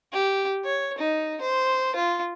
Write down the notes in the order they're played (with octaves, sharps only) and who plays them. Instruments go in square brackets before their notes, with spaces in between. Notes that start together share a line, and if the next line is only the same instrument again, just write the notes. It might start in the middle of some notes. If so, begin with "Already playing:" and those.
[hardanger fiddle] G4
C#5
D#4
C5
F4